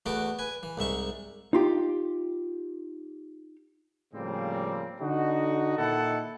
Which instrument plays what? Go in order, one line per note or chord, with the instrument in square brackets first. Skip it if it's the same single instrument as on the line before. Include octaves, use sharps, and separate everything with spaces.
[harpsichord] E2 A3 B3 F#4 D6
B4 G#5
E3
C2 G#2 E5 C#6
[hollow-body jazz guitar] D#4 F4 G4
[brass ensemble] A2 C#3 F3 G3 A#3 C4
D3 D#4 F#4
A#2 D#3 D#4 E4 A4 F#5